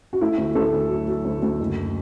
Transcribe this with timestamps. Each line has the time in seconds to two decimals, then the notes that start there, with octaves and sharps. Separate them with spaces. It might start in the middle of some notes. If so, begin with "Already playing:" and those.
0.13 F#4
0.21 A3 E4
0.38 D2
0.55 D2 A4
0.73 D2
0.90 F#3
1.08 F#3
1.25 D2
1.42 D2
1.60 F#1